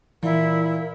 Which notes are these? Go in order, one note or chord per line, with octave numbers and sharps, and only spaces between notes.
A#2 E3 E4 A#4